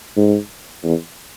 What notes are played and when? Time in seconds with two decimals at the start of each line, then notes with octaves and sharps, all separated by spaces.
0.16 G#2
0.84 E2